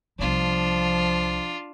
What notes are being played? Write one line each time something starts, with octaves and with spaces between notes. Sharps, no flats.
C2 F3 B3 D4 F4